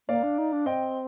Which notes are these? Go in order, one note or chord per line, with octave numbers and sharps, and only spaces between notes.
A#3 D5 F5
D4
D#4
D4
C4 D#5 G5